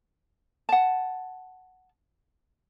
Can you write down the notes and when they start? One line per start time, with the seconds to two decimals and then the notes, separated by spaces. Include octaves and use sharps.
0.69 F#5 A5